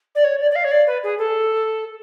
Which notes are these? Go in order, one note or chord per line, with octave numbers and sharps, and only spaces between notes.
D5
C#5
D5
D5
F5
C#5
D5
B4
G#4
A4